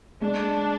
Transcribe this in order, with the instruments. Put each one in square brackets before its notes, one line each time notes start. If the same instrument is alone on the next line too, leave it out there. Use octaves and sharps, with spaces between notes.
[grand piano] G#3 [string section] D4